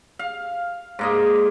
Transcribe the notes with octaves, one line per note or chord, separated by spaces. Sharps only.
F5
G#2 A#3 D#5